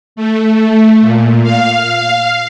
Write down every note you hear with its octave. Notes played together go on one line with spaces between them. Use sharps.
A3
A#2
F5